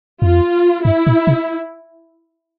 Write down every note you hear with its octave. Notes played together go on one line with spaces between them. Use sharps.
F2 F4
G2 E4
A#2
C3